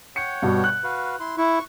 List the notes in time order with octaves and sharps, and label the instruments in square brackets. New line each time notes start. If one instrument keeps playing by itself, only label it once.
[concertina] C#5 F#5 G5 [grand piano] C#7
[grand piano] G2 B2
F#6
[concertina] F#4 B4 F5
E4 C6
[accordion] E4 [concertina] C#6